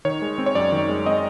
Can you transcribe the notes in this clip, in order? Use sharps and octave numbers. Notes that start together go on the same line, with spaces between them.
D#3 C#5
G#3
C4
C#5
F#2 D5
D#3
G#3
C4 D#5